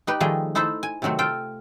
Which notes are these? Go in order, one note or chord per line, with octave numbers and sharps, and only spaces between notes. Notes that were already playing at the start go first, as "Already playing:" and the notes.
D#4 G4 B4
D#3 F3 G3 A3 G#4 D#5
D#4 E4 A4 C5 E5
G#5
C3 D#3 F#3 A3 C4
F4 A4 G5